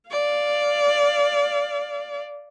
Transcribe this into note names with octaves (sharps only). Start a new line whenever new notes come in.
D5 F5